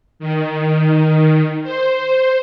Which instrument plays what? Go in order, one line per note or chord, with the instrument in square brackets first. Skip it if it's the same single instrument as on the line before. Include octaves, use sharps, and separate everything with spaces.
[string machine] D#3
C5